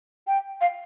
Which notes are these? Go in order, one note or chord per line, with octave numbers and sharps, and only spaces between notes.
G5
F5